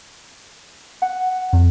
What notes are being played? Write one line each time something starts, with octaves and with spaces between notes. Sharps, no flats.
F#5
F2